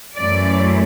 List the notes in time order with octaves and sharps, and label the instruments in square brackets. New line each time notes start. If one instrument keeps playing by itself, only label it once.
[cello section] F#2 E3 A3 C#4 D5